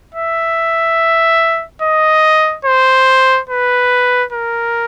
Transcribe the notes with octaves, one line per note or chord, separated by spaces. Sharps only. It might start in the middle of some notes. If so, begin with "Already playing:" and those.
E5
D#5
C5
B4
A#4